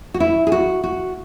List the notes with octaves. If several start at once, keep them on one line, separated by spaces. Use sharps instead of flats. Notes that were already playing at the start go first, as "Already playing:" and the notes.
F#4
E4
G#4
F#4
F#4